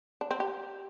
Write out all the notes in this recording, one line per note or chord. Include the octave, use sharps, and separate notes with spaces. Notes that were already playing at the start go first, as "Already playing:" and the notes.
D4
C4
G4